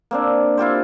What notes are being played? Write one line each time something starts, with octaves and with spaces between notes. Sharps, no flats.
A#3 C4 D4
E4 F4 G4 C5